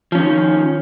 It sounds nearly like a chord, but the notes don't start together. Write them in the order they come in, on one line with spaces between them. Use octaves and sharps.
F3 C#4 D#3